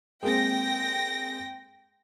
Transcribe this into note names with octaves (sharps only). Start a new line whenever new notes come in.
G#3 A#3 C4 G5 A#6